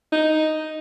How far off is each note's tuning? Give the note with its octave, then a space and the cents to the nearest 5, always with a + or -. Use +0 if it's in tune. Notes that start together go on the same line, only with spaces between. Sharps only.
D#4 +0